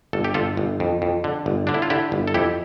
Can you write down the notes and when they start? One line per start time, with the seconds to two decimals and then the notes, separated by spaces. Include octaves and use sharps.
0.13 G1 A4
0.24 G4
0.34 G1 F4 A4
0.57 G1
0.80 F2
1.02 F2
1.24 D3
1.46 G1
1.67 D3 D4
1.74 E4
1.82 F4
1.90 D3 E4 G4
2.12 G1
2.28 A4
2.34 F2 E4 G4